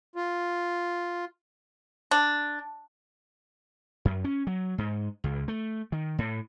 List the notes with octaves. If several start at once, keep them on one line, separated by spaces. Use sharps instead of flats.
F4
D4
F#2
C#4
F#3
G#2
C#2
A3
D#3
A2